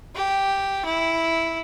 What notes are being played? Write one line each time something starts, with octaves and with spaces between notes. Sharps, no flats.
G4
E4